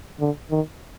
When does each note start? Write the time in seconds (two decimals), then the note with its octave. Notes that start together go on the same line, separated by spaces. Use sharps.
0.20 D3
0.51 D#3